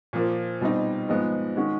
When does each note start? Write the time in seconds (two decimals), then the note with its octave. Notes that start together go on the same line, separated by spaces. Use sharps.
0.13 A#2 F3 A#3
0.61 B2 G3 C4 D#4
1.09 G#2 F3 G#3 B3
1.57 D#3 G#3 C#4 F#4